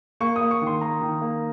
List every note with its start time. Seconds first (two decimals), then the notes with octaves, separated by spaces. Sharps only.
0.21 A#3 C#6
0.36 D#6
0.41 A#3
0.51 C#6
0.62 D#3
0.67 C6
0.81 A#3 A#5
1.01 D#3
1.22 A#3